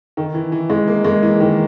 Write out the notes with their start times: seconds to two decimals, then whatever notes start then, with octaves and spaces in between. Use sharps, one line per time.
0.17 D#3
0.34 E3
0.52 E3
0.70 G#3
0.87 A#3
1.04 G#3
1.23 E3
1.40 D#3